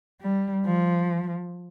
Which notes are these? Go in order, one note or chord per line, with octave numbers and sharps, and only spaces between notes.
G3
F3